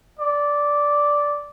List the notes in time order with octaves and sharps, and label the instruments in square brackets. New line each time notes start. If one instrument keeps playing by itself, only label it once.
[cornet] D5